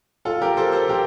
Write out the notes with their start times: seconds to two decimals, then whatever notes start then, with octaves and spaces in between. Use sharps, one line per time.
0.25 F4 A4
0.42 G4 A#4
0.57 A4 C5
0.72 A4 C5
0.89 G4 A#4